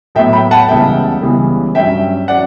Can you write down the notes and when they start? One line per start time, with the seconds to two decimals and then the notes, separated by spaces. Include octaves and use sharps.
0.15 A2 F#3 B3 E5 G5
0.33 G5 B5
0.51 F#5 A5
0.68 C#2 C#3 E3 G3 B3 E5 G5
1.22 C#2 C#3 E3 G3 B3
1.75 G2 F#3 C#4 E5 G5
2.28 F#3 C#4 D5 F#5